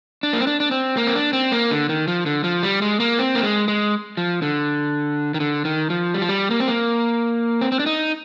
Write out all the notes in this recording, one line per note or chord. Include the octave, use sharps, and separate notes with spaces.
D4
A#3
C4
D4
D4
C4
A#3
C4
D4
C4
A#3
D3
D#3
F3
D3
F3
G3
G#3
A#3
C4
A#3
G#3
G#3
F3
D3
D#3
D3
D#3
F3
G3
F3
G3
A#3
C4
A#3
C4
C4
D4
D#4